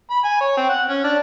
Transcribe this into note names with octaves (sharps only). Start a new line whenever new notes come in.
B5
G#5
C#5
C4
F#5
C#4
D4